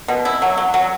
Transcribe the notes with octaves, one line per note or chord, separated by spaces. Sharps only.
B2
E4
F#3
F#3
F#3